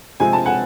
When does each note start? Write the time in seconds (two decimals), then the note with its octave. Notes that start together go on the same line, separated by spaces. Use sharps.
0.20 C3 F3 G#3 C4 G#5
0.33 A5
0.45 F#5 G#5